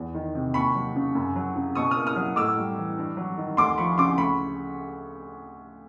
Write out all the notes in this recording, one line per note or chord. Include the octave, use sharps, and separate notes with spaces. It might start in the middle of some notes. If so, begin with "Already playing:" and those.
Already playing: E2
D#3
C3
D#2 B5 C#6
F#3
C#3
F#2
F#3
C#3
B2 C#6 D#6
D#6 F6
A#3
D#6 F6
F#3
A2 D6 E6
G3
E3
G2
F#3
D#3
D2 C6 D6
F3 B5 C#6
C#3 C6 D6
D2 B5 C#6